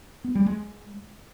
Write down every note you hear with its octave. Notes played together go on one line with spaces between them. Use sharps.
B3
G3
G#3